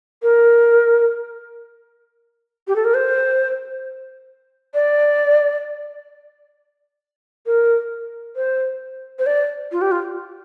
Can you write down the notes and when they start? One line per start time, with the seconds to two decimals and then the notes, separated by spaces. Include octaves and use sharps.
0.23 A#4
2.68 G4
2.76 A4
2.85 A#4
2.94 C5
4.74 D5
7.46 A#4
8.36 C5
9.19 C5
9.26 D5
9.72 F4
9.81 G4
9.91 F4